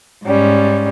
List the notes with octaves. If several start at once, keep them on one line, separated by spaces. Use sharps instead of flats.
G#2 G3 C#4